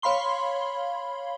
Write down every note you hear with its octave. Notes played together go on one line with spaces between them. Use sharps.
C#5 F5 B5 C6 G7